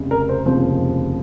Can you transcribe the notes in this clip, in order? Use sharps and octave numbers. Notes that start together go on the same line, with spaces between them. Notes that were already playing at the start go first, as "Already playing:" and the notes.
Already playing: F1 C#3
A#4
C5
F1 D#2 C#3 F3 C5